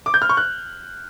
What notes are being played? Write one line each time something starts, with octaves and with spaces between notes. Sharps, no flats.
D6
G6
F6
C#6
F#6